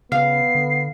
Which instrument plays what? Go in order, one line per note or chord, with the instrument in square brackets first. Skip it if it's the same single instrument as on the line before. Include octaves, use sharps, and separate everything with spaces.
[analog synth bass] C#3 [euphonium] B3 [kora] F5 [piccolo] C7
[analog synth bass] D3